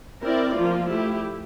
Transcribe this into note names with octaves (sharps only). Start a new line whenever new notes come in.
C4 E4 A#4 D5
F3 A#3 F4
A3 E4 G4